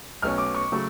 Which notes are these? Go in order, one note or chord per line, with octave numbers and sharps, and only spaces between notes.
B1 B2 A3 C#4 F6
D6
C#6
C#3 F#3 A3